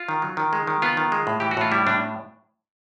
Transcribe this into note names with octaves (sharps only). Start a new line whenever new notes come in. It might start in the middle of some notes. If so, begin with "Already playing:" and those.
Already playing: F4
D#3
F#3
D#3
G#3
D#3
B3 F4
D#3
G#3
A2
E3 G4
F#4
A2 F4
G3 E4
A2 D4